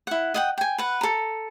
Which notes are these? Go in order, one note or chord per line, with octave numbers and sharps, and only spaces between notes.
E4 F#5
D#5 F#5 G5
G5 G#5
B4 F#5
A4 A#5